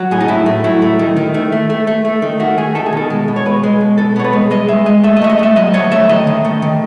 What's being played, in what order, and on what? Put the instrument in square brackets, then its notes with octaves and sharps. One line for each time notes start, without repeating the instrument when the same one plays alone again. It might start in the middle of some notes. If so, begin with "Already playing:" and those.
Already playing: [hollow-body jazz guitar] F#3
A2 G#4
D#4
A2 E4
A3
F#3 E4
A3
D#3
D#3
A3
A3
A3
A3
A3
D#3
A3 F#4
A3 G#4
D#3 A4
G#4
B2 A4
G#3
B2
C#5
G#3 B4
G#3
B2
B2 A4
B3 C#5
B4
G#3
G#3 D#5
G#3 E5
G#3 D#5
A3 E5
D#5
A3 E5
D#5
A3 E5
F#3 D#5
A3 C#5
A3 E5
D#3 D#5
D#3
A3
D#3